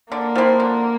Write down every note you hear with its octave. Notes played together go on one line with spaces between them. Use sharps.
D3 A#3
F3 C4 E4
D3